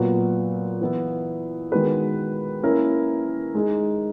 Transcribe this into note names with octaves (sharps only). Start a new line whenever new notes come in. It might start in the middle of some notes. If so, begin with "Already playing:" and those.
Already playing: A#2 F#3 B3 F#4
E3 B3 E4
D#3 G#3 B3 F#4 B4
A#3 C#4 E4 A#4
G#3 D#4 G#4